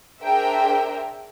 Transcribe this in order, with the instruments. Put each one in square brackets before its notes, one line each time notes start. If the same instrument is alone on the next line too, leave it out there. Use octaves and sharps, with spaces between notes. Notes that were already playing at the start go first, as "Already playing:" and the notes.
[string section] D4 G#4 A#4 C5 E5 G5